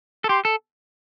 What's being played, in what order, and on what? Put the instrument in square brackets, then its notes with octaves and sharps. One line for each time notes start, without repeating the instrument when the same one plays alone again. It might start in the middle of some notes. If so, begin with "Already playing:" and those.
[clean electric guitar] A4
[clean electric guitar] G4 [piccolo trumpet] C6
[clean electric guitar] A4